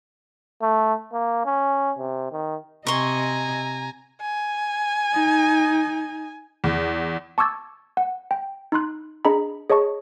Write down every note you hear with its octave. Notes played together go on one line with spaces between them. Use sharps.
A3
A#3
C#4
C3
D#3
C3 D#5 G#5 A#5 C6 C#6
G#5
D#4
E2
A5 C#6 D6 E6 G#6 A6
F#5
G5
D#4 B5 C6 F#6
D4 G#4 D#5 A#5 B5
G#4 C#5 D#5 A5 C#6